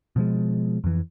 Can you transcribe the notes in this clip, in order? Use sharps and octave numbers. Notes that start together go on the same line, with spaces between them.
B2 F3 G#3
F2 E3